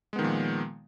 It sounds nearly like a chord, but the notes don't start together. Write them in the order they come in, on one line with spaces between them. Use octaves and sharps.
G#3 B3 D#3 F3 A#2